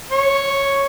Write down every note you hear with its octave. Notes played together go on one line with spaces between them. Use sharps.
C#5